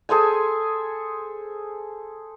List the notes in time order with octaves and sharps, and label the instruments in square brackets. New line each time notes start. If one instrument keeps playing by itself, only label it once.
[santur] G#4 A4 C5 G#5